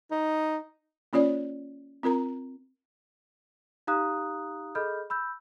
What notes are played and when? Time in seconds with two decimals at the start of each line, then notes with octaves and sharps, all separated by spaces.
0.11 D#4
1.13 A#3 C#4 F4 C#5 D5
2.03 C4 F4 A#4 A#5
3.87 D#4 G4 F5 A#5 D#6 F#6
4.75 G#4 A4 D#5 B5 F6 G6
5.10 B5 E6 G6